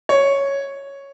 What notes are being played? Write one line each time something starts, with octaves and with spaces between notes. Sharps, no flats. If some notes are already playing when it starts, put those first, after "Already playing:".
C#5